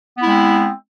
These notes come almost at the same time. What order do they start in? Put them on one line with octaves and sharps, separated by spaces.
B3 E4 G#3 C4